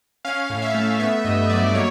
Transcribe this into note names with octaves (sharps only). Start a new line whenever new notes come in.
C#4 F5
A2
E5
A3
B3 E5
G2 D#5
F#3 D5
A#3 C#5